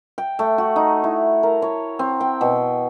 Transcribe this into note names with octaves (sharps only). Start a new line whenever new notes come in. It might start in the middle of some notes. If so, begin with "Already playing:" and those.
G5
A3
F#4
D#4
E4
A#4
C#5
C4
G5
B2